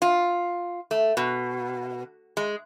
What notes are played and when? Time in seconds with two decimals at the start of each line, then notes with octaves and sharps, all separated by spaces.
0.02 F4
0.91 A3
1.17 B2
2.37 G#3